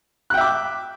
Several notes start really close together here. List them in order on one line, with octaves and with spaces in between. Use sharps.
F#6 G5 E5 D6